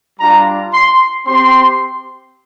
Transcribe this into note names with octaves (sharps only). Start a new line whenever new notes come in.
G3 D4 F4 A#5
C6
C4 G4 C6